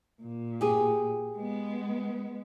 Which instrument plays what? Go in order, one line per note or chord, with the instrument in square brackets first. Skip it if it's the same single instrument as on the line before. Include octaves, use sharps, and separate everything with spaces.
[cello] A#2
[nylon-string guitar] G4 G#4
[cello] G#3 B3